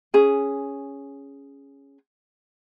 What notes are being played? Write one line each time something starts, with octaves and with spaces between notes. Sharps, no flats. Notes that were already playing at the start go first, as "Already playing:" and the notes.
C#4 G#4